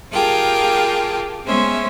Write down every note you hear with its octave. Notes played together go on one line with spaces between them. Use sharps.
F4 G4 G#4 A#4 G5 A5
G#3 B3 C#4 C5 E5